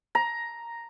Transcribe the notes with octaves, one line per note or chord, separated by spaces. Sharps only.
A#5